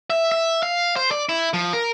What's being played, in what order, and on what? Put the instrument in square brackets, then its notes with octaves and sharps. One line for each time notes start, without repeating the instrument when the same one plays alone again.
[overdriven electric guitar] E5
E5
F5
C5
D5
E4
F3
A#4